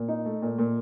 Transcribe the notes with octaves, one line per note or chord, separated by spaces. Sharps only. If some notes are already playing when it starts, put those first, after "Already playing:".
Already playing: A#2
D#4
A3
A#2
A#2